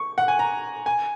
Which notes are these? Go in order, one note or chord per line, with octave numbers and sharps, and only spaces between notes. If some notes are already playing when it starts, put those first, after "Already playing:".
Already playing: C#6
F#5
G#5
A#5
G#5